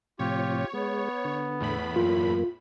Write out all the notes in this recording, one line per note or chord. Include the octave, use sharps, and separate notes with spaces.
A2 C3 F3 F4 G4 C#5
G#3 B3
D3
E2 A2 B5
F#2 A#3 F4